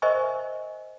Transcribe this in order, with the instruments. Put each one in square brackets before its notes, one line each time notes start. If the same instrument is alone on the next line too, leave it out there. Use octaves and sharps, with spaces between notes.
[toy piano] A#4 C5 D#5 E5 G#5 C#6